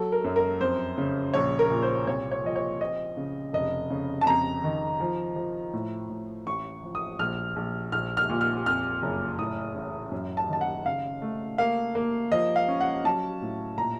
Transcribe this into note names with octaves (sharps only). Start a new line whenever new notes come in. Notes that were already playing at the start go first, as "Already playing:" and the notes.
Already playing: F#3 A4
A#4
F#2
A#4
F2 C5
C#3
A#1 C#5
A#4
A#2
C5
C2 C#5
C#5
F3 D#5
C#5
C4 D#5
C#3
F1 D#5
C#3
A5
F2 A#5
D#3
F3
F3
A2
A2
A1 C#6
F3
D#6
A#1 F6
A#1
A#1 F6
F6
A#2
F6
F2 F6
F#1
A2 D#6
A1
F#2
A5
D#3 A5
F#5
C#3 F5
A3
A#3 F5
A#3
F3 D#5
F5
C#4
F#5
F#3 A5
A2
A#2 A#5